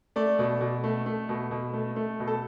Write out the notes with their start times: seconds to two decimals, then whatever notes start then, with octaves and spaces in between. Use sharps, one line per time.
0.16 A3 D5
0.39 B2
0.61 B2
0.84 A3
1.06 A3
1.29 B2
1.51 B2
1.73 A3
1.96 A3
2.20 B2
2.27 A4